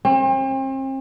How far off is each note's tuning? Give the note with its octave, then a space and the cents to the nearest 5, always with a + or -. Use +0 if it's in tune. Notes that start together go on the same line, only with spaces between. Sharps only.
C4 +40